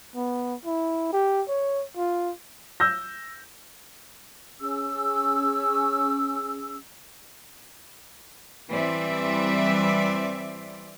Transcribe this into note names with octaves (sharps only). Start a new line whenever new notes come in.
B3
E4
G4
C#5
F4
E6 G6 A#6
C#4 G#4 E6
E3 G3 C4 D5 E5